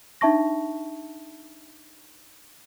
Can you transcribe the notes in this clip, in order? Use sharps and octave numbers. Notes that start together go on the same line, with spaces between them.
D4 D#4 E5 A5 C#6 A#6